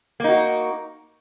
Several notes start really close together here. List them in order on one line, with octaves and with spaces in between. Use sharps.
A#3 D#4 F#4